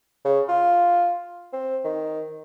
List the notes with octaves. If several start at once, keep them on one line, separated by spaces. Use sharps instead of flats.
C#3
F4
C4
D#3